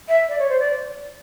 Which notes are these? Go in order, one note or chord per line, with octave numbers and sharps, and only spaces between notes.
E5
D5
C#5
C5
D5